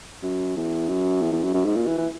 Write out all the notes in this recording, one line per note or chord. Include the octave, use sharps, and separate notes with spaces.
F#2
E2
F#2
E2
E2
F#2
F#2
G#2
A#2
E3
E3